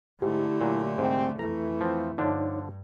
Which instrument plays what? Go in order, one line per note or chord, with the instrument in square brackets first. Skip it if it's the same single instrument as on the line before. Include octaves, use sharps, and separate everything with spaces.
[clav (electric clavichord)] G#2 [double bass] D3 A3 [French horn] E4 [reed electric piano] G4
[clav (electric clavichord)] A#2 F#3
[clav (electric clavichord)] C2 G#2 [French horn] C4
[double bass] F2 A3 [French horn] E3 [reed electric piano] A4 [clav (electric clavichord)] A#5
[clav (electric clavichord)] F3 C4
[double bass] G2 [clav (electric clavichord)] D3 F3 D4 [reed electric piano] D#4 C#5